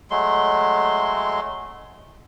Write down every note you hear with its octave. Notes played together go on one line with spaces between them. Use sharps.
F#3 G#3 A3 C6